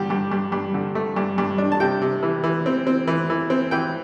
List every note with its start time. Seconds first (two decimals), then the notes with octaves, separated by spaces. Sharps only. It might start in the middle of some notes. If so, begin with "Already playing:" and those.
Already playing: G2 D3 G4
0.10 G2
0.32 G2
0.52 G2
0.74 D3
0.95 A3
1.16 G2
1.38 G2
1.58 D4
1.72 A5
1.80 C3 G5
2.02 C3
2.23 E3
2.43 E3
2.66 C4
2.87 C4
3.07 E3
3.30 E3
3.50 C4
3.71 E3 G5